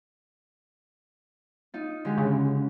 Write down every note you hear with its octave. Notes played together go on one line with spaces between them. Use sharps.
D#4 F4
D3 G#3 G4
C#3